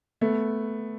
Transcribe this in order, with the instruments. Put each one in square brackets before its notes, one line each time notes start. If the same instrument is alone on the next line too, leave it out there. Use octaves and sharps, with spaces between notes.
[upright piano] A3 B3